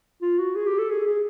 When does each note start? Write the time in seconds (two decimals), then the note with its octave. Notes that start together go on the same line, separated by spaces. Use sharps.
0.22 F4
0.39 F#4
0.56 G#4
0.67 G4
0.79 A4
0.90 G#4
1.07 G#4